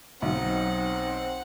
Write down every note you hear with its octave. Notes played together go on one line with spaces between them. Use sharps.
B1 F#3 C4 D#4 F#5